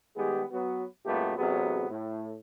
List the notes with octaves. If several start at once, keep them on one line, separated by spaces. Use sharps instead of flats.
D#3 G3 G#3 B3 G4 G#4
F#3 B3 F#4
F#2 A#2 G#3 A3 B3 G4
A1 C3 F#3 B3 G#4
A2